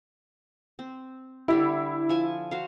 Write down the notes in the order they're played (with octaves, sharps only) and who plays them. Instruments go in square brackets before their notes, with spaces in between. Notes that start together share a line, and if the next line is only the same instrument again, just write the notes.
[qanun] C4
[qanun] D3 G3 G4 [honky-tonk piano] E4
[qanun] F3 G#5 A5
F#4 C5 F5